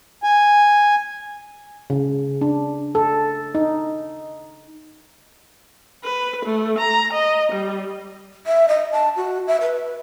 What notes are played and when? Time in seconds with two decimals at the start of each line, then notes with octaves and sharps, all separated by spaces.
0.23 G#5
1.90 C#3
2.41 D4
2.95 A4
3.55 D#4
6.04 B4
6.45 A3
6.79 A#5
7.13 D#5
7.52 G3
8.47 E5
8.68 D#5
8.92 A5
9.17 F#4
9.48 E5
9.61 B4